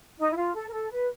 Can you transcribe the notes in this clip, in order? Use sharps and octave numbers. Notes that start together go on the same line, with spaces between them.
D#4
E4
F4
A4
A#4
A4
B4